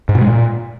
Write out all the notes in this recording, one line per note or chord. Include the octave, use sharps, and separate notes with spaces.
G#2
B2
G#3
A#2